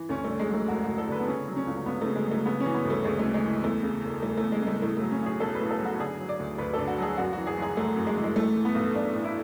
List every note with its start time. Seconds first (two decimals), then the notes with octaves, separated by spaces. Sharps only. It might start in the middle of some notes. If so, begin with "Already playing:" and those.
Already playing: E3
0.09 D2 C#4
0.24 D3 A3
0.39 G#3
0.49 F#3 A3
0.68 E1 F#4
0.84 D2 F#4
0.98 A4
1.08 D3 B4
1.20 B3
1.27 C#3 C#4
1.48 F#3
1.56 C#4
1.67 C#2
1.86 C#2 B3
2.01 C#3 A3
2.16 G#3
2.26 F#3
2.31 A3
2.45 C#3 B3
2.60 C#4
2.66 E3
2.74 B3
2.85 D2
2.90 A3
3.04 D2 G#3
3.19 C#3 A3
3.34 G#3
3.44 E3
3.63 E2 A3
3.83 C#3
4.03 E1
4.22 E1 A3
4.37 A3
4.43 E2
4.52 G#3
4.62 C#3
4.67 A3
4.82 A2 A3
4.97 F#3 A3
5.11 C#4
5.21 B1 G#4
5.40 B1 A4
5.55 B4
5.60 A2
5.71 A4
5.80 F#3
5.85 F#4
5.99 D3 G#4
6.20 F#3
6.29 D5
6.39 D2
6.58 D2 B4
6.73 D3 A4
6.88 F#4
6.98 F#3 G#4
7.17 F#2 F#4
7.33 E3 F#4
7.47 G#4
7.57 F#1 G#4
7.77 F#1 A3
7.96 F#2
8.07 G#3
8.17 E3
8.24 G#3
8.36 A2 A3
8.56 E3
8.65 B3
8.75 B1
8.95 B1 D4
9.14 A2
9.24 E4